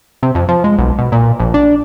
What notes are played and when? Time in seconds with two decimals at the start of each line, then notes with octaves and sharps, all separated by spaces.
0.23 C3
0.35 F2
0.48 F3
0.64 G#3
0.79 B1
0.99 B2
1.12 A#2
1.40 A#1
1.54 D4